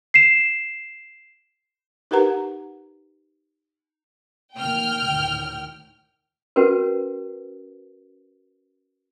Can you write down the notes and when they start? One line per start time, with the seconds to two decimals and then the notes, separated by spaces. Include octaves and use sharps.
0.14 C7 E7
2.11 D#4 G4 A#4 B4 F#5 A#5
4.56 F1 D#3 A#3 G5 F6
5.04 D2 A2 D#3
6.56 C#4 F#4 A#4 B4